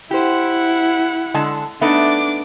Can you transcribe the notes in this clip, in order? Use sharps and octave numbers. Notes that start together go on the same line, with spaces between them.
E4 G4 C5 F#5
D3 G#3 A5
A3 B3 D4 D#4 D6